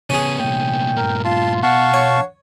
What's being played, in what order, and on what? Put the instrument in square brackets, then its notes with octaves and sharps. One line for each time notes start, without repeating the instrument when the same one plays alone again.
[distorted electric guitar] C#3 B3 [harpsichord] C#4 G#4
[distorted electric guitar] C2 A#2 [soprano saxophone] G5
[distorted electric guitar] G2 A#2 [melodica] A#4
[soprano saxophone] F4 [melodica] A5 C6
[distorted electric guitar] B2 [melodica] F5 A5 C#6 [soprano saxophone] F#5
[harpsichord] C#5